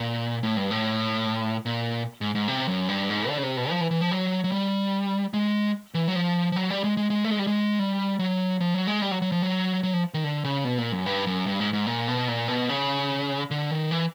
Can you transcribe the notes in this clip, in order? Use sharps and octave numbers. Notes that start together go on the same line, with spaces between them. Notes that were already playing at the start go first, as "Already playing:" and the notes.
Already playing: A#2
A2
G2
A2
A#2
G#2
G#2
C3
F#2
G2
G#2
D3
C#3
C3
B2
F3
E3
E3
F3
F#3
F#3
G3
G#3
E3
F#3
F3
F3
F#3
G3
G#3
G#3
G#3
A3
G#3
G3
G#3
G3
F#3
F3
F#3
G#3
G3
F#3
F#3
F3
F#3
F#3
F3
D#3
D3
C#3
B2
A#2
F#2
G2
F#2
G2
G#2
G#2
A#2
B2
A#2
B2
C#3
D3
D#3
E3